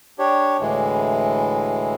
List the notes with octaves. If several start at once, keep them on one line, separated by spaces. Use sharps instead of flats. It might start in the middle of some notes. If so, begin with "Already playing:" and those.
D4 G4 C#5
D2 A2 E3 G#3